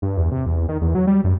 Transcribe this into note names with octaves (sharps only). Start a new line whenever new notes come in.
G2
E2
C3
E2
D#3
E2
F#3
G3
F#2